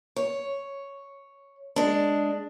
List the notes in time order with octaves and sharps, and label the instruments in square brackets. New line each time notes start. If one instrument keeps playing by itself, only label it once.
[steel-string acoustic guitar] C#5
G#3 D4